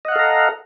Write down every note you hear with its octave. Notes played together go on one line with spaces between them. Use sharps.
A4 D#5 F5 F#5 A#5